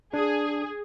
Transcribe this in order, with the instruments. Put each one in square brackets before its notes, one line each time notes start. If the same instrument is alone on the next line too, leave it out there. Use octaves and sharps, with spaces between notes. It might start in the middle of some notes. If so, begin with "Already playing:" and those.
[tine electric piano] D4 [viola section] G#4